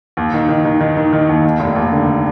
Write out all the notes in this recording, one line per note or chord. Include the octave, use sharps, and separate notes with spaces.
D#2
D#3
D#3
D#3
D#3
D#3
D#3
D#2
D#2
F1
D#2
D3